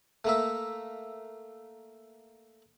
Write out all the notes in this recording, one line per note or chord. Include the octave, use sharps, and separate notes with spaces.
A3 A#3 E5